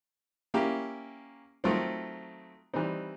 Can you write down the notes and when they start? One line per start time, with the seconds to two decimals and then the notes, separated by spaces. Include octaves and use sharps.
0.54 A#3 C#4 E4 G4
1.64 D#3 F#3 A3 C4 F4
2.73 E3 G3 C4 D#4